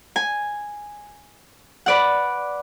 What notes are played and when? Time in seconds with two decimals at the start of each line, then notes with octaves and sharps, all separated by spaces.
0.16 G#5
1.86 B4 D5 F#5